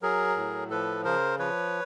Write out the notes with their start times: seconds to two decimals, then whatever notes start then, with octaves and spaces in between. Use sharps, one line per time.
0.02 F#3 G#4 A#4
0.36 A2
0.70 F3 A4 B4
1.04 C#3 A#4 C5
1.39 F3 B4 C#5